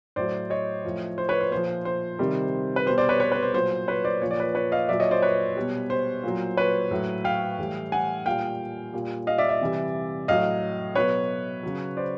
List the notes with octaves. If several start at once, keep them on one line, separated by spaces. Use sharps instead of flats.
A2 F#3 C5 D5
C#5 D#5
A2 F3
C5
B4 C#5
C5
A#2 F3 C5
C5
C3 D#3 G3
B4
B2 G3 C5
C5 D5
B4 C#5
B4 C#5
B4
C5
A#2 F#3 C5
B4 C#5
C5 D5
A#2 F3 C#5
D5
B4 C#5
B4 C#5
D#5 F5
A#2 F#3 D5 E5
C#5 D#5
C5 D5
B4 C#5
B2 G3
C5
A#2 F#3
B4 C#5
A2 F#3
F5 G5
A2 E3 G3
F#5 G#5
A#2 G3 F5 G5
A#2 G3
D#5 F5
D5 E5
D5 E5
C3 E3 G3
A2 F#3 D#5 F5
B2 F#3 B4 C#5
C#3 F#3
C5 D5